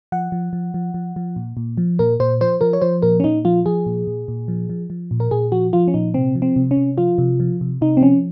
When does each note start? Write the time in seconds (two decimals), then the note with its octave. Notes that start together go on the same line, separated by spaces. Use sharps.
0.12 F3 F#5
0.32 F3
0.53 F3
0.74 F3
0.94 F3
1.16 F3
1.36 A#2
1.57 A#2
1.78 F3
1.99 A#2 A#4
2.20 A#2 C5
2.41 F3 C5
2.61 F3 A#4
2.73 C#5
2.82 F3 C5
3.02 A#2 A#4
3.20 C#4
3.24 A#2 D#4
3.45 F3 F4
3.66 F3 G#4
3.86 A#2
4.07 A#2
4.28 A#2
4.48 F3
4.69 F3
4.90 F3
5.11 A#2
5.20 A#4
5.31 A#2 G#4
5.52 F3 F#4
5.73 F3 F4
5.88 C#4
5.94 A#2 D#4
6.14 C3 C4
6.35 F3
6.42 C4
6.56 C3
6.71 C#4
6.77 C3
6.98 F3 F4
7.18 C3
7.40 F3
7.61 C3
7.81 C3 D#4
7.97 C4
8.02 F3 C#4